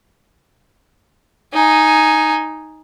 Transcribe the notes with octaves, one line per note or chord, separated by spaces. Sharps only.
D#4 G#5